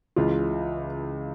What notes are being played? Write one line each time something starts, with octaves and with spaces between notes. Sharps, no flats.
C#2 C#3 E3 F4